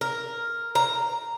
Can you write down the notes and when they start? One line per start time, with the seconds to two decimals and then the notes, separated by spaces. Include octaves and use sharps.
0.01 A#4
0.75 A#5